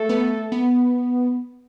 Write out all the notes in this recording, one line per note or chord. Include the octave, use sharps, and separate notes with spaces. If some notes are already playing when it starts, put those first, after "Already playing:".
Already playing: A3 A4
B3
B3